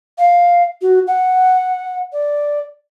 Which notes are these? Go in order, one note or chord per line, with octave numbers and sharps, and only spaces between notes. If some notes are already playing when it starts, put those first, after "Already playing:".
F5
F#4
F#5
D5